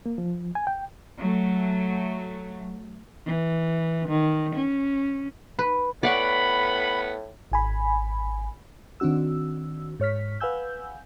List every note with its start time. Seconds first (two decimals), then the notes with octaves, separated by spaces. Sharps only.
0.06 A#3
0.18 F3
0.55 G#5
0.67 G5
1.19 F#3 A3
3.27 E3
4.08 D#3
4.55 C#4
5.59 B4
6.03 A2 B3 D5 F#5 B5 C#6
7.52 G#1 G#5 B5
9.00 D#3 C4 D4 F#4 E6
10.00 G#2 C#5 F6 B6
10.40 B4 F5 F#5 G#5 E6 G6